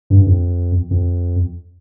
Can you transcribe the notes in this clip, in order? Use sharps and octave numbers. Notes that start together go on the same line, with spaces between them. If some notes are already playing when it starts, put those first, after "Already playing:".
G2
F2
F2